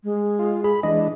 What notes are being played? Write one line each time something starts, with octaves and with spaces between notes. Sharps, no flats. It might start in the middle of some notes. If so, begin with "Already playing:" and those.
G#3
F4
G#4 B5
E3 G#3 D4 D#5